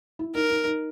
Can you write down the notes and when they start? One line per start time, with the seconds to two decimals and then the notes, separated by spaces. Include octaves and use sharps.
0.19 E4
0.34 D#4 A#4
0.50 D#4
0.65 D#4